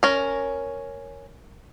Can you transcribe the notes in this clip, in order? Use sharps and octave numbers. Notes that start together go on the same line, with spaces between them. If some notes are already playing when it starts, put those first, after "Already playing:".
C#4 A#4